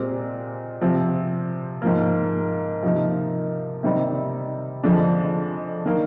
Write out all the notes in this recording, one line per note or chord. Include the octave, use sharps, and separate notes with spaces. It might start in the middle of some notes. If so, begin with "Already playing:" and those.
Already playing: A#2 G#3 C4 G4
C3 F3 C4
G#2 F3 A#3
C3 F3 A#3 D#4
C3 D#3 G3 C4 D#4
F2 D3 F3 G#3 D4
D#3 A#3